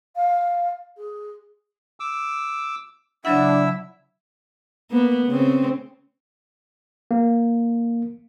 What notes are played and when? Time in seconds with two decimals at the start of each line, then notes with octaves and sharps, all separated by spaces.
0.15 F5
0.97 G#4
2.00 D6 E6
3.25 C#3 F#3 D4 E4 E5 F#5 E6
4.91 A#3 B3
5.27 C#3 C4
7.11 A#3